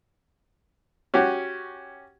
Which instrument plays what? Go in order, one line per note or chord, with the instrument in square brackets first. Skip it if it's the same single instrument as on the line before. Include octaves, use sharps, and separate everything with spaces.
[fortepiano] C#4 F#4 G4